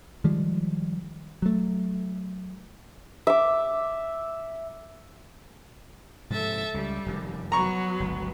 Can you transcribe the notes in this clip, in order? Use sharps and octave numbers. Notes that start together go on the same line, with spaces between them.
D#3 F3 G3 G#3
F#3 A3
E5 D6
G#2 C3 F3 A4 E5 A6
C#2 G3
F1 F#2 D#3
F#3 B3 A#5 C#6
G1 C#2